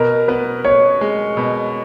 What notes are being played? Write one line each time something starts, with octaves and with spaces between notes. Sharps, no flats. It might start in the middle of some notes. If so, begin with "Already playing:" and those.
Already playing: B2 A#4
B3 B4
B2 C#5
G#3
B2